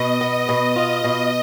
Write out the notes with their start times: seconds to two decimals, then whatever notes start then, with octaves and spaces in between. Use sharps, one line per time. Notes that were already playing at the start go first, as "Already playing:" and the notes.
Already playing: B2 D#5
0.21 B3
0.49 B2
0.76 F4 D#5
1.04 B2